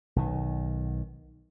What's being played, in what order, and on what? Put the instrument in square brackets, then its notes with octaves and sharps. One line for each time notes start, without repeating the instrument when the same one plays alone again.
[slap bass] B1 D#3